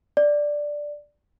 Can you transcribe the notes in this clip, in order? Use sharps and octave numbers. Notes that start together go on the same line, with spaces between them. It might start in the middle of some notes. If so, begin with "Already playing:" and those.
D5